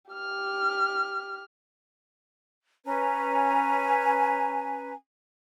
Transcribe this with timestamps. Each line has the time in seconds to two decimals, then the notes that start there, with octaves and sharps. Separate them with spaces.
0.11 G4 F6
2.86 C#4 B4 G#5 A#5